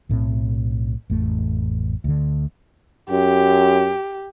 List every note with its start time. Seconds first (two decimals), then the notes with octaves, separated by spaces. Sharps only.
0.09 B1 A2 C4
1.10 A1 F2 A3
2.04 D2 D3
3.10 F#2 G4